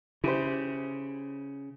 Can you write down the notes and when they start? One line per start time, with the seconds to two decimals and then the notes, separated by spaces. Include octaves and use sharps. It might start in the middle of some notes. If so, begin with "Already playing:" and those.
0.24 C#3 E4 G4 C5